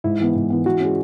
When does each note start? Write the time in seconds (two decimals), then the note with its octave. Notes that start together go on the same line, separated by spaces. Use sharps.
0.04 G#2 E4
0.19 E3 B3
0.35 G#2
0.50 E3 B3
0.66 E3 F#4
0.80 G#3 C#4